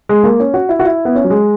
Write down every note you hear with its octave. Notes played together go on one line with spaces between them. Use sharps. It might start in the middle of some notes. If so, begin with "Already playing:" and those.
G#3
A#3
C#4
F#4
E4
F#4
E4
B3
C#4
F#3
G#3